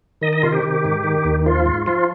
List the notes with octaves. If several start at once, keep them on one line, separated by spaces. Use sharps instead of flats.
D#3 D#5
D#5
C3 F4
G4
D#3
G#2
D#3
D#2
F3 F4
G#2
F3 F4